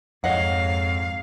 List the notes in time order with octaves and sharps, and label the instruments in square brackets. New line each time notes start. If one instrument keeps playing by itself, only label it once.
[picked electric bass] F2 [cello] G#2 F5 [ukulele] C#5 D#5 F#5